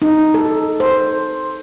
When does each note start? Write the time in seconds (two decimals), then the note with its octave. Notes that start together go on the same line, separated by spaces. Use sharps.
0.02 D#4
0.34 A4
0.80 C5